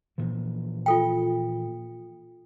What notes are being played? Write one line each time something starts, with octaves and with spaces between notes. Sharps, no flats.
A#2 E3 F3
F4 A4 G5